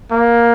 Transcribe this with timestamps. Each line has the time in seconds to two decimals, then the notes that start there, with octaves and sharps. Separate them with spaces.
0.11 A#3